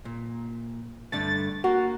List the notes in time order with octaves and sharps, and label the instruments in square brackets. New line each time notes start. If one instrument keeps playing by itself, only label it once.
[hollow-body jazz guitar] A#2
[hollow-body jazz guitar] G2 D3 A3 [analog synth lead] A6
[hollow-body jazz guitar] A#3 [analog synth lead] F#4